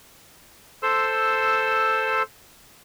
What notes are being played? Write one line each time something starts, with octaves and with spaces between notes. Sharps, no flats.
A4 C5 C6 E6